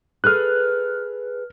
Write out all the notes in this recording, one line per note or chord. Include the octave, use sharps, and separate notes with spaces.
G#4 A4 B4 F6 F#6